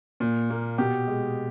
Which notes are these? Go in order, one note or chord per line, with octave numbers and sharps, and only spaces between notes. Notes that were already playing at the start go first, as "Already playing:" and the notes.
A#2
A#3
B2 G4
G#3